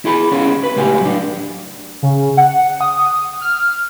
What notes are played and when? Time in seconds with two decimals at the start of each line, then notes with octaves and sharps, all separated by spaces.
0.05 E4 G#4 B5
0.32 B3 C#4 G#4
0.63 B4
0.76 C#2 A2 G4 G#5
1.01 F#3 D4
2.03 C#3
2.37 F#5
2.81 D#6
3.41 F6